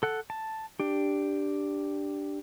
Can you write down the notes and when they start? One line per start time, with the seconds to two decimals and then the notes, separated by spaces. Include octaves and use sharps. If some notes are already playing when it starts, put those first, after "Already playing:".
0.03 A4 F#5
0.30 A5
0.80 D4 G4